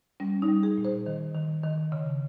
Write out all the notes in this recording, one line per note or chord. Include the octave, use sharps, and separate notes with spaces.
G3 C#4
D#4
G3
G#4
A#2
C5
D#3
D#3
D#3
C#3